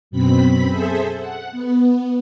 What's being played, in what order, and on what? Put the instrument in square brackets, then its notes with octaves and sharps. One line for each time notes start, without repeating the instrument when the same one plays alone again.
[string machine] F#2 B2 C4 B5 B6
G#4 A4 C5 E5
F#5
B3